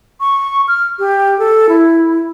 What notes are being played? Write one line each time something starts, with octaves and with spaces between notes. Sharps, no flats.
C#6
F6
G4
A4
E4